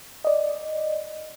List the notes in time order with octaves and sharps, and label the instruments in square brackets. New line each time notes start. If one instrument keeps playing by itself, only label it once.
[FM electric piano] D5 D#5